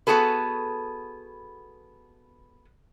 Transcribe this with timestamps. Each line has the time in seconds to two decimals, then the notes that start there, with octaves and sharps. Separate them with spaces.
0.07 B3 F#4 G#4 A4 B4